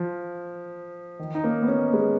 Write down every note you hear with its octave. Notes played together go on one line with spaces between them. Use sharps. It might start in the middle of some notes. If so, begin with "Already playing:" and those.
Already playing: F3
D#3
D#4
A#3 C#4
B3
A#3 C#4
G#3 B3